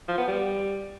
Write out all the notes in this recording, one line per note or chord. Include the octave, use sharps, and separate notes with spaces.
F3
B3
G3